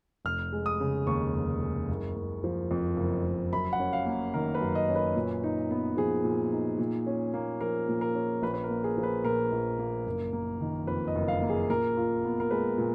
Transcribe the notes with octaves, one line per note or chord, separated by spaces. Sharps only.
F1 F6
G#3
D#6
C#3
D#2 C#6
F1
G#3
F#1
F#1
F3
F2
F#1
F#1
F#2 B5
F#5
C#4
F5
A#3
D#3 A#4
B4
F#2
D#5
C#4
B4
A#2
D#4
B3
F3 G#4
A#2
D#4
A#2
C#4
A#3
F3 A#4
A#2
A#4
C#4
A#1 B4
B4
A#4
A#3
G#4
F3
B4
A#2 A#4
A#1
A#3
F#1
A#3
D#3
F2 B4
D#5
F#1
F5
A#3
G#4
A#2 A#4
F4
B3
A#4
G#3 B4
A#2